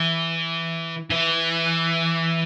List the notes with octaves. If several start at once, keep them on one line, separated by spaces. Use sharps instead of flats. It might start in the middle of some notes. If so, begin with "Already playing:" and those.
Already playing: E3
E3